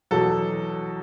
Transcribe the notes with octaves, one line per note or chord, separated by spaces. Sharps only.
E2 B2 F#3 A4